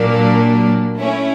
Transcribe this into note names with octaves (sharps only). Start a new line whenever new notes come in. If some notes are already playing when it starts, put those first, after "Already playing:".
Already playing: A#2 F#3 A#3 D4
A3 C#4 E4